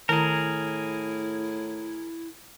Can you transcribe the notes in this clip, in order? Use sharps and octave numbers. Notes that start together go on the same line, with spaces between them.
A2 D#3 E4 G#4 A#4 A#5